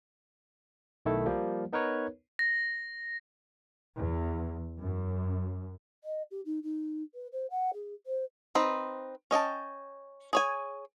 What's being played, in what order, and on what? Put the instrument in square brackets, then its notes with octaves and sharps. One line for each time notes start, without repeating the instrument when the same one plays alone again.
[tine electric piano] B1 D#3 A3 E4 A4
F3 G3 A#3
B3 D#4 A#4 B4 C#5
[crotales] A#6
[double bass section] E2
F#2
[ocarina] D#5
G4
D#4
D#4
B4
C5
F#5
G#4
C5
[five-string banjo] C4 D#4 B4
C#4 D#5 G5 A5
G#4 C#5 G#5